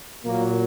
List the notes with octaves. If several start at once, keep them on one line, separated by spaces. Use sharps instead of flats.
A#2 F#3 A#3